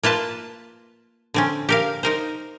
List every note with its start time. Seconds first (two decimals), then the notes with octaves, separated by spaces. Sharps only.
0.03 A#3 F4 B4 A5
1.34 D3 C4 C#4
1.69 G4 A#4 F5
2.03 D#4 A#4 C5